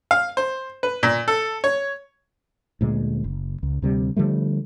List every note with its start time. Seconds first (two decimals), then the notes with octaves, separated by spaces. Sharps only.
0.11 F5
0.37 C5
0.83 B4
1.03 A#2
1.28 A4
1.64 C#5
2.81 D2 A#2 G#3
3.24 F#1
3.63 C#2
3.82 D2 C3 G3
4.16 D3 F3 G3 A3